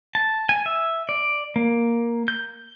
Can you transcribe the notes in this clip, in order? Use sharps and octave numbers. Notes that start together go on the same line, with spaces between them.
A5
G#5
E5
D5
A#3
G6